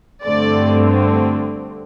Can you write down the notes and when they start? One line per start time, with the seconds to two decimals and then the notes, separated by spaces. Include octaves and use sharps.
0.25 G2 D3 A3 C4 D5